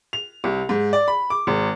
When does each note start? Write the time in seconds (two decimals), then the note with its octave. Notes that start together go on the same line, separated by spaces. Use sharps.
0.13 F7
0.44 C2
0.69 G#2
0.93 D5
1.08 B5
1.30 D6
1.47 G#1